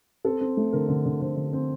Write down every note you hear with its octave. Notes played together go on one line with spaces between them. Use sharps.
C4 A4
C4
A3
D3 A#4
D3
D3
D3 C5
D3
C4